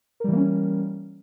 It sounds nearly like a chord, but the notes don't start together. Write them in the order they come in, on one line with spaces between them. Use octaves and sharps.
A#4 G3 E3 A#3 C#4